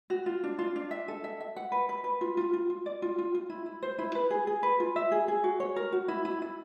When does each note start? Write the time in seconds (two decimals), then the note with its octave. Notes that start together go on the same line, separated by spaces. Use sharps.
0.10 F#4
0.26 F4
0.43 D4
0.59 F4
0.76 D4
0.91 E5
1.08 A4
1.24 E5
1.40 E5
1.56 F#5
1.72 B4
1.89 B4
2.04 B4
2.21 F4
2.37 F4
2.53 F4
2.70 F4
2.86 D5
3.02 F4
3.18 F4
3.34 F4
3.50 E4
3.66 E4
3.82 C5
3.98 E4
4.15 B4
4.30 G#4
4.47 G#4
4.63 B4
4.80 F4
4.96 E5
5.12 G#4
5.28 G#4
5.44 F#4
5.60 C#5
5.76 A#4
5.92 F#4
6.08 E4
6.25 E4
6.42 E4